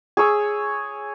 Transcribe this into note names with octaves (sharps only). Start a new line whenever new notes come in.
G#4 C#5 E6